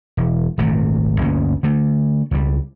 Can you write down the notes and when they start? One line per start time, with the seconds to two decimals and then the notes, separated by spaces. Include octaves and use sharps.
0.17 E1
0.58 D#1 G#1 C3 A3
1.21 G1 D2 A#3 C#4
1.63 D3 A3
2.31 C#2 F#3 G3